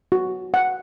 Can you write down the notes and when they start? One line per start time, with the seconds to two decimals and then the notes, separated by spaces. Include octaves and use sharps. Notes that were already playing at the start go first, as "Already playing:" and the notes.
0.12 F#4
0.54 F#5